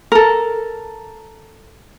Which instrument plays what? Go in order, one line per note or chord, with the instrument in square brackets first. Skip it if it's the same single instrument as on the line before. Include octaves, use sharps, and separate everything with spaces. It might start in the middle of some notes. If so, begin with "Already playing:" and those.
[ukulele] A4 A#4